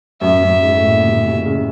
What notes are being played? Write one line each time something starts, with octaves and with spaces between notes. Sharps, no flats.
F#2 E5
F#2
G#2
A2
A#2
C3
C3
C#3